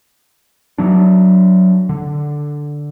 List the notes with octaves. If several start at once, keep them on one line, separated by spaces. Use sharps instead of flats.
F#3 D4
D3